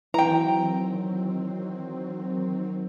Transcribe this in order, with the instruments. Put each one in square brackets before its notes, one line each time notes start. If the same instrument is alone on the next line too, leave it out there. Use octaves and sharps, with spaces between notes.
[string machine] D#3 F#3 C4 [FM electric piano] E3 [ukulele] G5 A#5